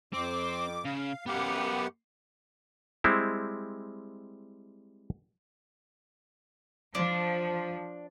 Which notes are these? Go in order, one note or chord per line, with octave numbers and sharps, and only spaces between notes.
F2 C4 D6
C#3 F5
F#2 B3 G4 F5 F#5
G3 G#3 C4 E4
F3 D4